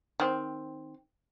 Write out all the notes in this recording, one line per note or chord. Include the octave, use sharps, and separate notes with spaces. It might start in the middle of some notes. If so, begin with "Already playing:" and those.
D#3 C4